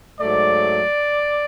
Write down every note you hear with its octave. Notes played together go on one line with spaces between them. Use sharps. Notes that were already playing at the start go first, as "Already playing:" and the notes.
G#2 F#3 A3 D5